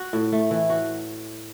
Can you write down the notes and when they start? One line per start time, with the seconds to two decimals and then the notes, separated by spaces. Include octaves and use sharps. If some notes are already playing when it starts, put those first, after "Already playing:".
Already playing: F#4
0.13 A2
0.32 A3
0.51 E3
0.70 F#4